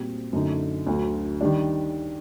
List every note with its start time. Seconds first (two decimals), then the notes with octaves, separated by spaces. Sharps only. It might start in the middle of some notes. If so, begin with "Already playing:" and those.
Already playing: A#2 G3 C4 F#4
0.33 F#2 D3 A3 D#4
0.87 D2 D3 F#3
1.41 D#3 G3 D4